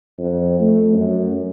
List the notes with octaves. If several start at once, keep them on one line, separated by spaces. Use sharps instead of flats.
F2
A3
F#2